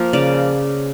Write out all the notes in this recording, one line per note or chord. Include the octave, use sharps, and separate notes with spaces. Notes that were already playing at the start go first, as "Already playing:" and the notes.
Already playing: F3 A#3
C#3 D5